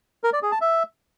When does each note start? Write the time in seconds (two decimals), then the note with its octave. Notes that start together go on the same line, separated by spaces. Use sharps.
0.24 A#4
0.33 D5
0.42 G#4
0.52 A5
0.61 E5